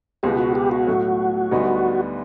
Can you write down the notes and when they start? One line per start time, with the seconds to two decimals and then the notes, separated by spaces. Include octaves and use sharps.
0.23 C#2 B2 G#3 B3 G4
0.39 F#4
0.55 G4
0.71 F#4
0.87 A2 F#3 A3
1.51 D2 D3 G3 B3 D#4